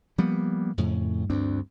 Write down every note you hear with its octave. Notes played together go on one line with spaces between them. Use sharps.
F3 G3 A#3 B3
F2 A2 C#3
D2 G2 C4 D4